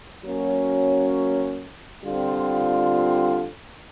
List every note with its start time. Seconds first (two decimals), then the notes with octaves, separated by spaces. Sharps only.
0.24 F#3 A#3 C#4 F#4
2.04 D3 G3 C4 F4